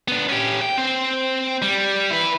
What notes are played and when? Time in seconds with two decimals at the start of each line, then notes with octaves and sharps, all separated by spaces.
0.08 B3 D4
0.29 C#4 G4
0.62 G5
0.77 C4 C5
1.62 G3
2.10 E4 B4